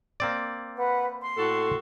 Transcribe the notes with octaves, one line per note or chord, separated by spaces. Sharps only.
A#3 C4 D5
B4 F#5
C6
A2 F#4 A4